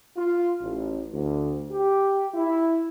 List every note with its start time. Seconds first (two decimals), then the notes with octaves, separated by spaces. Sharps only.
0.17 F4
0.61 A1
1.13 D2
1.71 G4
2.35 E4